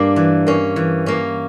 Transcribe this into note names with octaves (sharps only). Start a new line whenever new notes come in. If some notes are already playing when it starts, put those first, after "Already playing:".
Already playing: G2 A#3 D4
E3
A#3 C#4
E3
A#3 C#4